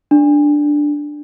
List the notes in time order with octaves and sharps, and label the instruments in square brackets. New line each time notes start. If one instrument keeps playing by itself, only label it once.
[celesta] D4